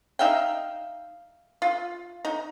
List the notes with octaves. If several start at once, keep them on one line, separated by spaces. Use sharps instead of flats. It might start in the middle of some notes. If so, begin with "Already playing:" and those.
D#4 E5 F5 G5
F4
D#4